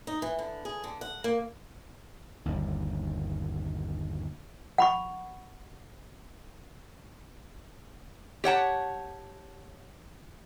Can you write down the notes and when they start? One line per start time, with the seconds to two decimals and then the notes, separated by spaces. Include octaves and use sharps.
0.07 D#4
0.22 E3
0.39 D3
0.65 G#4
0.84 D3
1.01 F#5
1.24 A#3
2.45 G1 D#2
4.78 F#5 B5 C#6
8.44 G4 C#5 F#5 A5